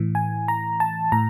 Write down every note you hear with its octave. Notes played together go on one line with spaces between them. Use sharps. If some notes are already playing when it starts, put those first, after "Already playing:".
Already playing: A2 E3
G#5
A#5
A5
A2 A#5